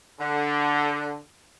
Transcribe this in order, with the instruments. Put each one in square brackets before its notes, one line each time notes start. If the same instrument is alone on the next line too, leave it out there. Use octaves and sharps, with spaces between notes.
[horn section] D3